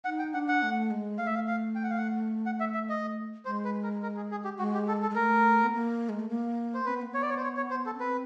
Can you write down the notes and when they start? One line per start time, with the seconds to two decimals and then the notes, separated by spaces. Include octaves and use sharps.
0.05 D#4 F#5
0.19 G5
0.34 D4 F#5
0.48 F#5
0.63 A3
0.91 G#3
1.18 A3 F5
1.26 E5
1.35 F5
1.48 F5
1.76 G5
1.83 F#5
1.90 F5
1.97 F#5
2.46 F#5
2.60 E5
2.74 E5
2.89 D#5
3.45 G#3 C5
3.65 B4
3.83 A#4
4.03 A#4
4.17 G#4
4.31 G#4
4.44 G4
4.59 G#3 F#4
4.74 G4
4.88 A4
5.02 A4
5.10 G#3
5.15 A3 A#4
5.64 B3
5.73 A#3
6.09 G#3
6.19 A3
6.29 A#3
6.74 C5
6.86 C4 B4
6.94 B3
7.02 A#3
7.10 B3 C#5
7.22 D5
7.30 C#5
7.37 C5
7.43 C#5
7.57 C#5
7.71 C5
7.86 A4
7.95 C#4
7.99 C4 B4